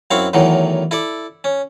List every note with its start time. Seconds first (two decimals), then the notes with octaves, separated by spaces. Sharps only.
0.11 F#2 C4 E4 F5 C#6
0.33 E2 A2 D#3 E3 F#3
0.91 E4 A4 D5
1.44 C#4